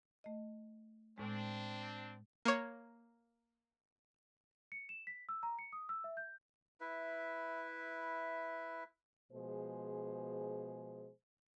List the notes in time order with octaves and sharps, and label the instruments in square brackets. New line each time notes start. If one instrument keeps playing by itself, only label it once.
[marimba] A3 D#5
[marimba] A2 G#3 [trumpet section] C4 D4
[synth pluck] A#3 C#5
[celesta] C#7
E7
B6
E6
A#5
C#7
D#6
E6
E5
G6
[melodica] E4 B4 E5
[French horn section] B2 F3 G#3 G#4 C5